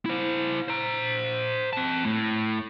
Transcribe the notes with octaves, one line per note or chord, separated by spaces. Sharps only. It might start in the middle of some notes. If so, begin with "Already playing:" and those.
E4 C5
C5 A#5
C4 A5
A2